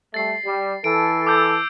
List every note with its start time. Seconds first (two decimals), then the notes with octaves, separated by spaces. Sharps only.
0.14 G3 A3 A6 C7
0.45 G3
0.84 E3 A4 D7
1.27 D6 E6 G6